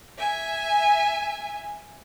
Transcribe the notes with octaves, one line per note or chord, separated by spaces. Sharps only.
E5 G#5